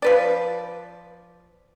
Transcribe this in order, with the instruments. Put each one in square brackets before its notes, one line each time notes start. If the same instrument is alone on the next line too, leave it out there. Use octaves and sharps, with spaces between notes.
[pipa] F3 B4 D5